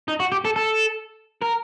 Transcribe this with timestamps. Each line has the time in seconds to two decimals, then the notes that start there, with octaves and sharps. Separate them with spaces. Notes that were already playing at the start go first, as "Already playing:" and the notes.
0.08 D#4
0.20 F#4
0.32 G4
0.45 A4
0.56 A4
1.42 A#4